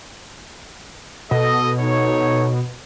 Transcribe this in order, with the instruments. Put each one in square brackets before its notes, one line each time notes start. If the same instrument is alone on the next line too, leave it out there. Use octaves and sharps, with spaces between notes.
[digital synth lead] B2 [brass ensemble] A4 D#5
[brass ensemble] D#4 A4 C#5